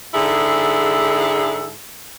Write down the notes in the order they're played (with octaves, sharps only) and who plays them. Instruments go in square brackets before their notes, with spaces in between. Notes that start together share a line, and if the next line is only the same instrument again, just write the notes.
[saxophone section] G#2 D3 E4 G#4 A4